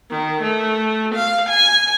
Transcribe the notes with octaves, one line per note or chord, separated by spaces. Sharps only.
D#3
A3
F5
G#5